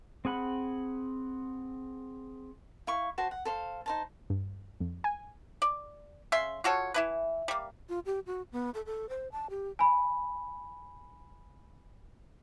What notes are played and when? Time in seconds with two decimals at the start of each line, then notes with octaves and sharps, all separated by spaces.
0.25 C4 G#4 F#5 B5
2.87 E4 F5 C#6
3.18 F#4 C5 A5
3.31 F#5
3.45 A4 C5 F5
3.86 D#4 C5 A5
4.30 G2
4.80 F2
5.04 G#5
5.62 D5
6.32 C#3 E5 C6
6.64 F4 F#4 A4 C#5
6.94 E3 E4 B4
7.48 G3 A#3
7.89 F4
8.06 G4
8.27 F#4
8.52 B3
8.74 A4
8.86 A4
9.09 C5
9.32 A5
9.50 G4
9.79 G#5 B5